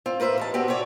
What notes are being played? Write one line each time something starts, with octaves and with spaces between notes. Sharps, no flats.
C4 F4
A#3 B4 C5 E5
D#2 E3 A5
B3 C4 F#4 G4
C3 F#4 C#5 D5